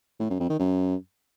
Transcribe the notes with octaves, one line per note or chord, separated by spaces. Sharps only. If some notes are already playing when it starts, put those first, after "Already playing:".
A2
F#2
F2
D#3
F#2